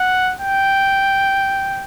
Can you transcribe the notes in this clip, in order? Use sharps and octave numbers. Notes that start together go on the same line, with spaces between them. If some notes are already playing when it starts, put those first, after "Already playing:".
Already playing: F#5
G5